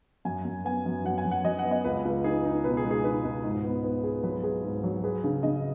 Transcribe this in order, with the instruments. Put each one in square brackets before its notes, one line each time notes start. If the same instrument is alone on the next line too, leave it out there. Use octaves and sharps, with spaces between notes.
[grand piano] F#2 [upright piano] G#5
[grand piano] F#2
[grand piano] B3 [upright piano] G#5
[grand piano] F#2
[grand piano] F#2 [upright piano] F#5
[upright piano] G#5
[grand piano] F#2
[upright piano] F#5
[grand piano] F#3 [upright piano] D#5
[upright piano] F#5
[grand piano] B3
[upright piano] D#5
[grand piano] C#2 [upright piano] B4
[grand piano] C#2
[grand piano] D#4 [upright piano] G#4
[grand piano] D#4
[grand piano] B2 [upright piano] B4
[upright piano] G#4
[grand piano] G#3
[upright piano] G#4
[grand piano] D#4 [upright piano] B4
[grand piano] C#2
G#2
B3
B3
G#4
[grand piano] F#3 [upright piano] B4
[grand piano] G#4
G#2
F#3
[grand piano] G#4 [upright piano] B4
[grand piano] C#3
[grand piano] C#3 [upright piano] D#5